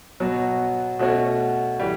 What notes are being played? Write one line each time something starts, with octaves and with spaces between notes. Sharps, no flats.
B2 F#3 B3 F#4
B2 A3 C#4 F#4 C#5
E3 G3